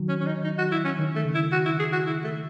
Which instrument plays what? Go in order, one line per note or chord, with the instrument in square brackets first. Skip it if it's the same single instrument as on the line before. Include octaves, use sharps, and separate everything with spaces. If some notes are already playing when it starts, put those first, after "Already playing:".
Already playing: [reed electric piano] D#3 F#3
[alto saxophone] C#4
C#4
D#4
D#4
F#4
E4
C#4
[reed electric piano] D#3
[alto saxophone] A3
[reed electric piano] C#3
[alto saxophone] E4
F#4
E4
G#4
F#4
E4
A3